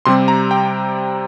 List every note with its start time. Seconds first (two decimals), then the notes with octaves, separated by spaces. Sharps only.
0.05 C3 G3 C4 C6
0.28 A#5
0.51 G5